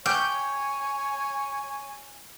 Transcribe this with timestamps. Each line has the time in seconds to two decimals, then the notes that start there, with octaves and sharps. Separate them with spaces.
0.06 G4 C#5 G#5 G6